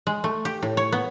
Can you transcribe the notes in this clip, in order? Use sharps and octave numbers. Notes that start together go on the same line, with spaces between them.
G#3
A3
G4
A2
C#5
B3